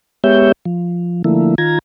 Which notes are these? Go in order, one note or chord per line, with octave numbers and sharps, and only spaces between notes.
G#3 B3 G4 C#5 E5 G6
F3
D3 F3 A3 A#3 E4
D#3 F4 A#5 G#6